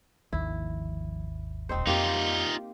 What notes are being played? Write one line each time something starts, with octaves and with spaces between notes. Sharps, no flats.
G#1 D#2 D3 D#3 F3 E4
D#1 A#3 C4 D#4 C5
F2 A#3 D#4 F4 G4 G5